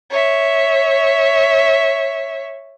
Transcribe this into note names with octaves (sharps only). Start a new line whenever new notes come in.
C#5 E5